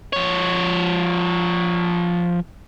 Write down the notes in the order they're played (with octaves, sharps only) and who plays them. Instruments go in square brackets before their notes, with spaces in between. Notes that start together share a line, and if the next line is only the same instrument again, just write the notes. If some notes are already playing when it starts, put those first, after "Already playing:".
[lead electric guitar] F3 C#5